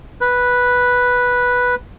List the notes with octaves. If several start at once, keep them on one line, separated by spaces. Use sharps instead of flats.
B4